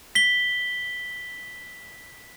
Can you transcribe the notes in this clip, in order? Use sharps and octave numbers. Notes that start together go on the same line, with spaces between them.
B6 G7